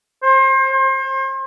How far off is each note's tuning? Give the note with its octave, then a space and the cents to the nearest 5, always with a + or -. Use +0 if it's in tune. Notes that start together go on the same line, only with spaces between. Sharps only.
C5 +30
C5 +35